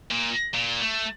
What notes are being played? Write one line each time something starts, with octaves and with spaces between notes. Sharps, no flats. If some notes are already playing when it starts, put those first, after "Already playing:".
A#2
A#2
A3